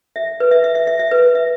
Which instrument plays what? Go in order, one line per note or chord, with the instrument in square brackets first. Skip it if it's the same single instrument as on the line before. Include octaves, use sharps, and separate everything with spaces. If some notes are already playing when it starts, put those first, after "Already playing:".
[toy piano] E5
B4
E5
E5
E5
E5
E5
B4
E5